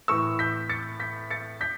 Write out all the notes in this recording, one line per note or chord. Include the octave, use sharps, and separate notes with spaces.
A2 E3 C#6 E6
G6 B6
A6 C#7
G6 B6
A6 C#7
G6 B6